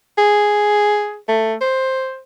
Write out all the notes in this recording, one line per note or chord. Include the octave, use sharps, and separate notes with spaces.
G#4
A3
C5